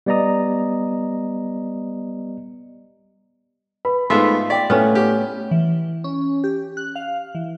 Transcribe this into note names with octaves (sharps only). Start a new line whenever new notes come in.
G3 B3 D5 D#5 A#5 D#6
B4 B5
G#2 A3 B3 F4 E5 C6
D5 G5 B6
A2 A3 B3 C#4 A4 F6
G4
E3
C#4
G4
F#6
F5
E3